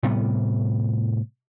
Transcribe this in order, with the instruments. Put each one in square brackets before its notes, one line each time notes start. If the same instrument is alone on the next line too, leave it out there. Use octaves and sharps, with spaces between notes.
[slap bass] A2 C3 G3 B3